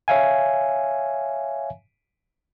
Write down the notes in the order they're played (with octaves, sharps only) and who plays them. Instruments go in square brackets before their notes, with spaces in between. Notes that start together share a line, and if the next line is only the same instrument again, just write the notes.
[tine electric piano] C#5 E5 F5 G#5